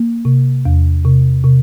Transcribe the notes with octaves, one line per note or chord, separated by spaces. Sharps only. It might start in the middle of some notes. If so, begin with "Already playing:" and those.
Already playing: A#3
C3
E2
C3
C3